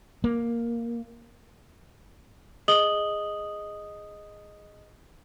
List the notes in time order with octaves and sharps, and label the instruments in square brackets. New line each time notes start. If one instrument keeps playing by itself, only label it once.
[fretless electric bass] A#3
[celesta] G#4 D#5 D#6 F#7 G7